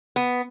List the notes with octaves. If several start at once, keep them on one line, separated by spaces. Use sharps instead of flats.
B3